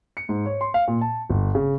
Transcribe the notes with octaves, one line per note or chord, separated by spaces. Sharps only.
C#7
G#2
C#5
C6
F5
A#2
A5
G1
C#3